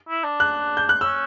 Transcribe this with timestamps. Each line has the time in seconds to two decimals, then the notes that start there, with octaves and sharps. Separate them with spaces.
0.09 E4
0.24 D4
0.40 F#6
0.77 G6
0.89 F#6
1.01 C#4 E6